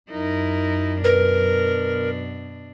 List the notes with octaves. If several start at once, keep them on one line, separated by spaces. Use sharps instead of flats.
F#2 D#4 E4 A#4
B2 D4 A#4 B4